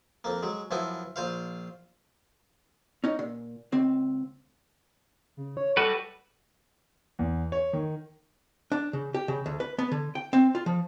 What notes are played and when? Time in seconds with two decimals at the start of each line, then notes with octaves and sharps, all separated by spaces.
0.24 F2 A#3
0.43 F#3 G#3
0.71 F#2 F3 B3 E4 G#5
1.16 A#1 F4 C5 F5
3.04 C#4 D#4
3.19 A#2
3.72 C#2 C4
5.37 C#3
5.57 C#5
5.77 G3 F#4 A4 B4
7.19 E2
7.52 C#5
7.73 D#3
8.72 D4
8.93 C#3
9.14 G4
9.28 C#3
9.46 D2
9.60 B4
9.78 B3
9.91 D3
10.15 G5
10.33 C4
10.55 F4
10.66 F3